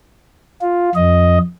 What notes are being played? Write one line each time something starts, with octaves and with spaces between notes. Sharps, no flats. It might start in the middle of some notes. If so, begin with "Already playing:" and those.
F4
F2 D#5